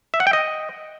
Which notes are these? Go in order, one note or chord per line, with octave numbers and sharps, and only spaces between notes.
E5
F#5
G5
D#5